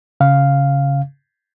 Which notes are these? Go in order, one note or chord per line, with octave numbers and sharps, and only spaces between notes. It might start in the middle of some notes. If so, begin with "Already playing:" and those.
C#3 F5